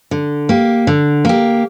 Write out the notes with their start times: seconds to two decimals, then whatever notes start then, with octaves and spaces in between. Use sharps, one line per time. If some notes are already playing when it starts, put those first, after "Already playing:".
0.11 D3
0.49 A#3 G4
0.87 D3
1.25 A#3 G4